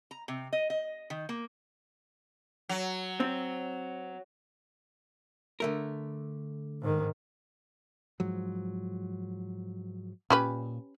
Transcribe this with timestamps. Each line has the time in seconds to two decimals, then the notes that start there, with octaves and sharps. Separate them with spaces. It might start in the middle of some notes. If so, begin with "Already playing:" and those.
0.11 A#5
0.28 C3
0.53 D#5
0.70 D#5
1.10 D#3
1.29 A#3
2.69 F#3
3.20 C4
5.60 D3 A3 A#4
6.81 G#2 D#3
8.20 G#2 F3 F#3
10.30 A#2 C#4 G4 B4